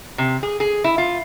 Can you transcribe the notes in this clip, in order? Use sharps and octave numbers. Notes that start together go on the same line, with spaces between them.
C3
G#4
G#4
E4
F4